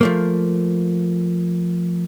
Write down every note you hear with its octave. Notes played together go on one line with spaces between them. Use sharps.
F3 A3 A#3